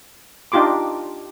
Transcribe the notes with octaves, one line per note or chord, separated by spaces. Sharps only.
D4 D#4 F4 G4 C6 D6